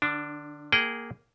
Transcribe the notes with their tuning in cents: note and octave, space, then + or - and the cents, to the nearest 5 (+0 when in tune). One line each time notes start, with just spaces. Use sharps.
D3 +35 D4 +0
A#3 +0 G#4 +0 G5 -30